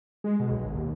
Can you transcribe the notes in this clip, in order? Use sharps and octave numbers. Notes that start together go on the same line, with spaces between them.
G#3
B2
B1
G#1
D#2